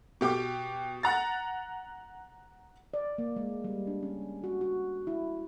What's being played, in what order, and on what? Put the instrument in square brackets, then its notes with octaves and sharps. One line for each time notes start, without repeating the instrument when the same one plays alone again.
[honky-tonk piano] B2 G4 G5 D6
F#5 A#5 A6
[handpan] D5
A#3
G#3
G3
D4
C#4
F#4
F#4
E4